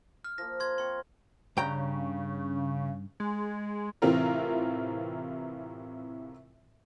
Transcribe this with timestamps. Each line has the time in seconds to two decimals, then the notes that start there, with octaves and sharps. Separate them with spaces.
0.24 F6
0.38 F3 A#3 A#6
0.60 C6 G#6
0.78 C4 C6 C#6
1.57 G2 C#3 G5 A#5
3.20 G#3
4.02 A2 C3 E3 C4 F4 A#4